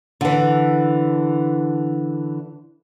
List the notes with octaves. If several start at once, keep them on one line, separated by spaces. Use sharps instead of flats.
D3 E3